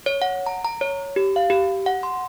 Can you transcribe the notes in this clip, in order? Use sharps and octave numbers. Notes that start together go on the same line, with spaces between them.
C#5
F#5
A#5
A#5
C#5
G4
F5
G4
F#5
C6